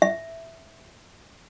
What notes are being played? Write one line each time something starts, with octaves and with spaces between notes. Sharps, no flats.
E5